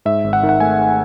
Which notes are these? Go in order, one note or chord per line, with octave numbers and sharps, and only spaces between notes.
G#2 E5
G#1
F#5
D#3
F#5
A3 G#5